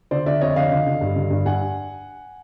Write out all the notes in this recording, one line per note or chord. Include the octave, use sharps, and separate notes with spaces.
D3 C5 D5
D3 D5 E5
F2 C#5 D#5
D3 D#5 F5
D3
D3
G2
D3
G2
G2 F#5 G#5